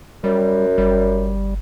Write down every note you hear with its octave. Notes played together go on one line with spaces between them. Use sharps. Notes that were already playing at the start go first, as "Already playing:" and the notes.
F#2 G3
G1 G3